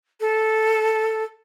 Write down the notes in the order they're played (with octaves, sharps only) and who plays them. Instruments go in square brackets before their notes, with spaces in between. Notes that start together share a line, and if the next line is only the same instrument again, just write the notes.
[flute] A4